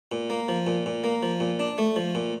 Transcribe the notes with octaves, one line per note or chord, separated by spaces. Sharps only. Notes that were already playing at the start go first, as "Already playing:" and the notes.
A#2
A#3
F3
A#2
A#2
A#3
F3
A#2
D4
A3
F3
A#2